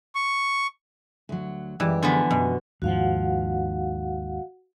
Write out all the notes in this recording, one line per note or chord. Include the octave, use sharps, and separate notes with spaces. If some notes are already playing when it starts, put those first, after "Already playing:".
C#6
D2 F#3
F#2 E3 G3 G#3 G4
D3 F3 B3 G#5
F#2 B2
D#2 G#2 F3 F#4 F5 F#5